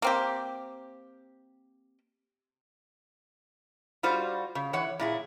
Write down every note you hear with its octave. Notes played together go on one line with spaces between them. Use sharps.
A#3 C4 G4
G3 F4 F#4 C5
C#3
E3 C#5 F#5
A#2 E4 G#4